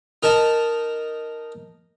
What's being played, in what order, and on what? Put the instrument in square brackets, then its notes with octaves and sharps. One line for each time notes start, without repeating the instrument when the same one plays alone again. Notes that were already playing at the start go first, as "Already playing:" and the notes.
[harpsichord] D#4 A#4 A5